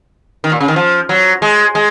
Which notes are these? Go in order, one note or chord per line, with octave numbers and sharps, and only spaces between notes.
D#3
A#2
C#3
D#3
F3
F#3
G#3
G#3